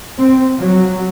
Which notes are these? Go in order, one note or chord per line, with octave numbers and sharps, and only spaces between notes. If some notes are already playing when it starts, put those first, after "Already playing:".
C4
F#3